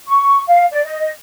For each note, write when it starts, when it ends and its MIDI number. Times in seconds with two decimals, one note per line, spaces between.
0.07 0.42 85
0.48 0.66 77
0.71 0.83 74
0.84 1.10 75